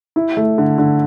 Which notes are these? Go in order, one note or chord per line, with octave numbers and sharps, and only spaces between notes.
E4
A3
D3
D3